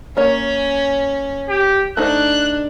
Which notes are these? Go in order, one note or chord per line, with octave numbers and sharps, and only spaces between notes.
A#3 C#4 C#5
G4
A3 D4 D#4 C5 F#6